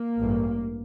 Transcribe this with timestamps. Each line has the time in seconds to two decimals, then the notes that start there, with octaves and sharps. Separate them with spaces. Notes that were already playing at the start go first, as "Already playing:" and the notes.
Already playing: A#3
0.17 A1 G2